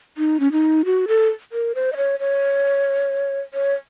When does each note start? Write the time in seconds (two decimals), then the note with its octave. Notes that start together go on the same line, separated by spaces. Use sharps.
0.18 D#4
0.40 C#4
0.52 D#4
0.85 F#4
1.08 A4
1.52 A#4
1.75 C5
1.93 D#5
1.97 C#5
2.20 C#5
3.54 C#5